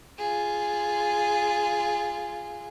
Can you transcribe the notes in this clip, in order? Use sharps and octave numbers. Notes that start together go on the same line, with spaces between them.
F4 G#4